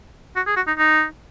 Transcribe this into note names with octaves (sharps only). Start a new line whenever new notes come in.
F#4
G#4
F#4
D#4
D#4